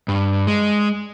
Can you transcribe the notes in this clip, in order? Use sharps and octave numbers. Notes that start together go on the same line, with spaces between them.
G2
G#3